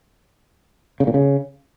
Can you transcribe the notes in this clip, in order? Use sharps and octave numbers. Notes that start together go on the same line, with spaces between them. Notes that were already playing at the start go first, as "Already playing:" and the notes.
C#3
A#2
C#3